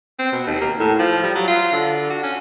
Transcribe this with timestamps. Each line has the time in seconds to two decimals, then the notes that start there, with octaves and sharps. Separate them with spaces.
0.19 C4
0.32 B2
0.47 D#2
0.61 A#3
0.80 A2
1.00 F3
1.24 G3
1.35 F#3
1.48 F4
1.72 D3
2.10 F#4
2.23 C#4